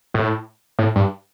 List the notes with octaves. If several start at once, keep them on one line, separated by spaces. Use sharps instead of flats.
A2
A2
G2